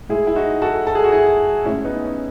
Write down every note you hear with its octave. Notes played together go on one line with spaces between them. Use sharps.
A2 G#3 E4 G#4
E4
D#4 F#4
F#4 A4
A4
G#4
F#4
E4 G#4
A2 G#3 C#4 E4
B3 D#4
C#4